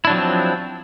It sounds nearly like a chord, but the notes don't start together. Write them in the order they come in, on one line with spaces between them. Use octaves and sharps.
E4 D4 F#3 F3 C4